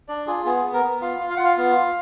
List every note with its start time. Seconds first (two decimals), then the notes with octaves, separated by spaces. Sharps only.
0.08 D4 D5
0.27 F4 G#4
0.45 B3 G#4
0.65 B3
0.73 A#4
0.84 B3
1.01 F4 F5
1.20 F4
1.30 F5
1.37 F4 F#5
1.44 F5
1.57 B3 F5
1.76 F4